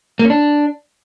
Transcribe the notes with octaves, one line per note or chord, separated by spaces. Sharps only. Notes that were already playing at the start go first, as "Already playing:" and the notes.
A#3
C#4
D4